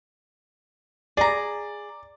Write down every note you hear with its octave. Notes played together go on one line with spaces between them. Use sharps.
G#4 D5 A#5